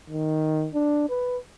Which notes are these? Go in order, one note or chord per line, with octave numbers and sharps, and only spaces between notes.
D#3
D4
B4